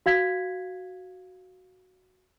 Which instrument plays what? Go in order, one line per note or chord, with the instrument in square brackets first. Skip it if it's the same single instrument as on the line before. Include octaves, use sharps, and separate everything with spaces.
[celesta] F#4 F5 G#6 B6